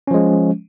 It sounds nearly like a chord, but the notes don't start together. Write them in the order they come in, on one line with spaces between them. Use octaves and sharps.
C#4 F3 G#3